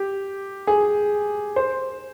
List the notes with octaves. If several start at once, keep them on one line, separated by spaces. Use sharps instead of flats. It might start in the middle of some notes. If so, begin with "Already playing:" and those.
Already playing: G4
G#4
C5